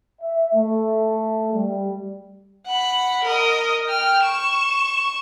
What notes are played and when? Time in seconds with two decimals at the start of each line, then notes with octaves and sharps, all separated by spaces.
0.22 E5
0.54 A3
1.53 G3
2.66 F#5 B5
3.24 A#4 D#5
3.88 G5 F6
4.23 C#6 E7